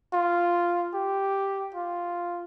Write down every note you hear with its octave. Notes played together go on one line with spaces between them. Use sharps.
F4
G4
F4